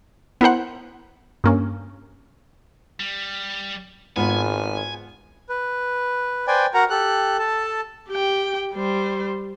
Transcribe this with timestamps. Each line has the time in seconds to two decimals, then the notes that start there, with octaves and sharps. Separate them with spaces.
0.41 B3 E4 A#4 C5 F#5
1.44 G2 A#3 C#4
3.00 G3
4.16 G#1 G#2 B3 F4 B4 G#5
5.49 B4
6.47 B4 C5 D5 G5 G#5
6.74 F#4 A#4 F#5 A#5
6.90 G4 A4 F#6
7.39 A4 A5
8.09 G4 G5
8.75 G3 C5